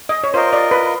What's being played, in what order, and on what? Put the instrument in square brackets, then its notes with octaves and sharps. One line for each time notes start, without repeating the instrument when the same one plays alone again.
[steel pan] D#5
C#5
[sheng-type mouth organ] F4 A#4 D#5 [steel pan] C5
[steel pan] D5
B4